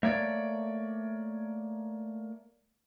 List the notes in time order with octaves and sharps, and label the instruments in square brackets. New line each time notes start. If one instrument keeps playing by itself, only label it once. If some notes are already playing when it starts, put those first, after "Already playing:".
[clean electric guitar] A3 A#3 C#5 D5